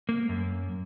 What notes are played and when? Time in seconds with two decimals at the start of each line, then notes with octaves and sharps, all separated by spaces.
0.09 A#3
0.29 F#2